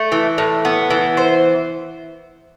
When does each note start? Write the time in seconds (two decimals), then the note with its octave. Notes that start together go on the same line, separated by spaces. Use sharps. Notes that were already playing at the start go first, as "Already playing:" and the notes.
Already playing: A3
0.12 E3
0.38 A2
0.65 B3
0.90 E3
1.17 C5